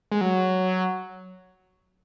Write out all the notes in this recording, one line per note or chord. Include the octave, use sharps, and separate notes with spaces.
G#3
F#3